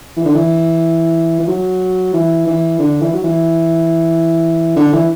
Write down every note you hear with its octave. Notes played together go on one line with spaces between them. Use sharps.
E3
D3
E3
E3
F#3
E3
E3
D3
E3
F#3
E3
D3
E3